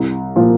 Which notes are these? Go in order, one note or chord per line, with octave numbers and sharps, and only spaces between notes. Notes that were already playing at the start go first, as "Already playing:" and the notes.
Already playing: C2
A#2 F3